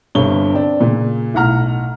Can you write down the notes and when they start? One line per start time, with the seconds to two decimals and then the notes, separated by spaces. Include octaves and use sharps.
0.15 G1 G2 C3 C#5 G7
0.54 C4 D4
0.81 A#2 C#3
1.34 B1 A2 F#5 A#5 F6